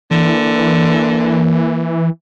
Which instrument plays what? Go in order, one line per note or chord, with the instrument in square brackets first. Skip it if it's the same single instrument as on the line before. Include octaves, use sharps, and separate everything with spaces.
[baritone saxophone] D3 [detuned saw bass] E3 [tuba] A#3